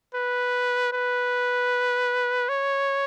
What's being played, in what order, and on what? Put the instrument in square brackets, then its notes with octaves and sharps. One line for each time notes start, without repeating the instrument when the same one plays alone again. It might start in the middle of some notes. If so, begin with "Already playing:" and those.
[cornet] B4
B4
C#5